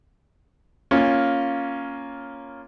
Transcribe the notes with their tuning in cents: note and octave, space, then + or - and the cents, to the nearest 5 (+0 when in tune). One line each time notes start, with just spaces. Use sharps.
A#3 +0 C#4 +0 F4 +0